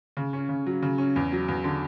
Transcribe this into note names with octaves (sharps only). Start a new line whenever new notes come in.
C#3
C#4
C#3
F#3
C#3
C#4
E2
F#3
E2
D3